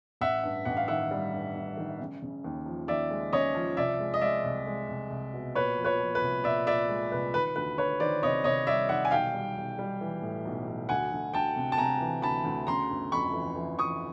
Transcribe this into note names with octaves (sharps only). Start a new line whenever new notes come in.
A1 E5 F#5
G2
A1 F#5
F5
D#3 E5 F#5
G3
G2
G2
D#3
C#3
C#3
D#2
F3
D#2 D5 E5
G#3
C#3 C#5 D#5
F3
C2 D5 E5
G#3
D#5
G#3 D5 E5
C2
G#3
C2
C2
B2
A#2 B4 C#5
F3
B4 C#5
F3
B4
C2
A#2 D5 E5
A#2 D5 E5
G#3
C2 B4
D#3 B4
D2 B4
D2 B4 C#5
D#3 C5 D5
C3 C#5 D#5
C3 C#5 D#5
G3 D5 E5
D#3 E5 F#5
G#5
B1 F5 G5
G3
B1
G3
E3
A2
B1
B1
D2 F#5 G#5
D2
D2 G5 A5
C3
A5
C3 G#5 A#5
E3
D2 A5 B5
D2
C#3 A#5 C6
G1
F2 B5 C#6
E3
E3
E3 C#6 D#6